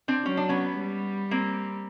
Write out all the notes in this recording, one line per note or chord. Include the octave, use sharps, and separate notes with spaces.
C4 D4
F#3 C#4
D4
B3 C#4
G3
A#3 C4